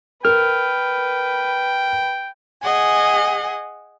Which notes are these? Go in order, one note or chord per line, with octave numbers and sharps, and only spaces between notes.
A#4 B4 G5 F6
G#4 D#5 F#5 G#5